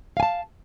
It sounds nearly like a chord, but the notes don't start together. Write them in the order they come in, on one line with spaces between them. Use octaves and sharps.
F5 G#5 A5